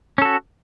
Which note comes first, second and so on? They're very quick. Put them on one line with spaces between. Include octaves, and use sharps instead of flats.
C#4 A4 F#4